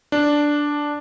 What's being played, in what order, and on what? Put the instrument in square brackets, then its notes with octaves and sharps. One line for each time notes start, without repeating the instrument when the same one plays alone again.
[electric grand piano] D4